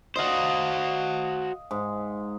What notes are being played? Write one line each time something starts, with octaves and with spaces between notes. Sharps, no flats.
F#4 C5 D#5 F5
G#2